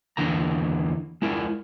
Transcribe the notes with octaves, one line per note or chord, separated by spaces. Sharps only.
E2 D3 E3 A#3 A#5
G#3 E4 A#4